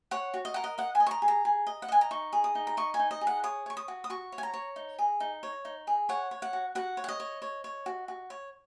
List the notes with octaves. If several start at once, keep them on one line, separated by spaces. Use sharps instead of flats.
C#5 F#5
F#4
D#5
A#4 F#5
D#5
D#5 F#5
G#5
D#5
C#6
A#5
G#4
A#5
G#4
D#5
F#5
D#5 G#5
A#5
D#4 C#6
G#4
D#6
D#4
A#5
D#5 C#6
G#5
D#4
D#5
G#4
F#5
C#5 D#6
C#5 C#6
D#6
F#4
D#6
F#4 C#6
C#5
G#5
A#5
C#5
D#4
G#4
D#4
C#5
D#4
G#4
C#5 F#5
C#5
F#5
F#4
F#4 F#5
C#5
F#5
D#5
C#5
C#5
C#5
F#4
F#4
C#5